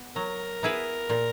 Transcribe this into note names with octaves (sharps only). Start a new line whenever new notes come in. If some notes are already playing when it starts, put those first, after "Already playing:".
Already playing: B3
F#3 A#4
B3 E4 G#4 B4
A#2